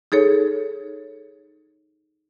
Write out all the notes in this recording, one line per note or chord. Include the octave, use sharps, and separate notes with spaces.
D#4 G#4 A4 C#5